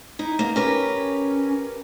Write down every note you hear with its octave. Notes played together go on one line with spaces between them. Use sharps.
D#4 E4
A#3 B3
C#4 G4 A#4 B4